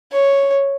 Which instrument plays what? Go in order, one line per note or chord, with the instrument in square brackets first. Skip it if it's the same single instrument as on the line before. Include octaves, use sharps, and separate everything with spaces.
[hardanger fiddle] C#5